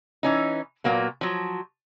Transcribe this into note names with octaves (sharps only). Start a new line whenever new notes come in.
E3 C#4 D#4
A#2 F#3 A#3 B3
F3 F#3